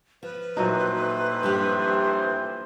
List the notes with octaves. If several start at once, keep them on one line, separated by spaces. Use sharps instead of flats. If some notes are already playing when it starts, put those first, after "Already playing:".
F3 B4
A1 A#2 E3 F#3 D#4 C5
G2 F3 G4